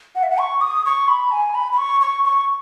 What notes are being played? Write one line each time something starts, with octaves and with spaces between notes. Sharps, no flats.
F#5
E5
F#5
C#6
D#6
C#6
B5
G#5
B5
B5
C#6
C#6
C#6